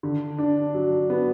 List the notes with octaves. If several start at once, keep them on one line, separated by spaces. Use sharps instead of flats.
D3
D4
F#3
B3